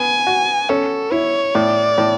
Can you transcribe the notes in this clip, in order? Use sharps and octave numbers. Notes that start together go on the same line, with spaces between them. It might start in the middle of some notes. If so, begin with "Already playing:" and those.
Already playing: B3 G#5
F#4
C#4 A4
E4 C#5
A2 D5
A2